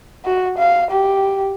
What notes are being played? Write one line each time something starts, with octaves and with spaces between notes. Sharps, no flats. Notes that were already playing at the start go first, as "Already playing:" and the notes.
F#4
F5
G4